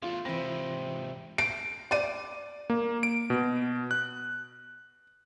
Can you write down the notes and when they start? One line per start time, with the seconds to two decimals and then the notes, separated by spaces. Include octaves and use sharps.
0.02 E2 A3 F4
0.25 G#2 C3 E3 C4 F4 E5 B5 A#6
1.38 D7
1.91 D5 D#7
2.70 A#3
3.03 D7
3.30 B2
3.91 F#6